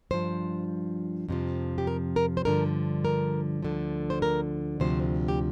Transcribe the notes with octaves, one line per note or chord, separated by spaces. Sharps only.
G2 F3 C5
F2 C3 F3
G4
A#4
A#4
C5
G2 D3 F3 A#4
A#4
D2 D3 F3
C5
A#4
D2 C3 F3 C5
G4